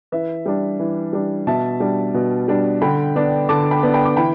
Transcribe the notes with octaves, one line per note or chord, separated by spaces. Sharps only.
E3 B4 E5
G3 D4
E3
G3 D4
B2 E5 A5
G3 D4
B2
G3 D4
D3 G5 B5
B3 D4
D3 A5 D6
G5 B5
B3 D4
G5 B5
D6
E3 G5 B5